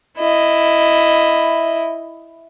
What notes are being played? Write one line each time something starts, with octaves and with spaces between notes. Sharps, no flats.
E4 D#5